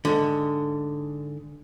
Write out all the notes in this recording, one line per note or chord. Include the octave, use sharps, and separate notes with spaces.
G#2 D3